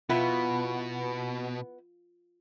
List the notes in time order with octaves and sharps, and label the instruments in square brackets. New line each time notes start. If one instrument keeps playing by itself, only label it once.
[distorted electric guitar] B2 [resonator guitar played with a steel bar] B3 E4 B4 [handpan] F4